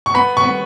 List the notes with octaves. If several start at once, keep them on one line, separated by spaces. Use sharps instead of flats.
C#6
B3 B5
C#6
B3